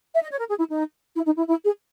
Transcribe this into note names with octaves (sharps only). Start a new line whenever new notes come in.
E5
D#5
C#5
A#4
G#4
E4
D#4
E4
D#4
E4
E4
G#4